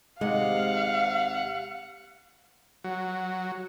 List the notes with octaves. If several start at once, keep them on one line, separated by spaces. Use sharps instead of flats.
D#2 C3 G#3 F5 F#5
F#3